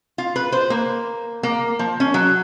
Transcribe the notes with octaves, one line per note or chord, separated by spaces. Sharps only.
F4
B4
C5
A#3
A#3
F3
C#4
F#3